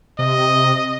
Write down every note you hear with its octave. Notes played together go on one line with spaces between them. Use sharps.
C3 D#5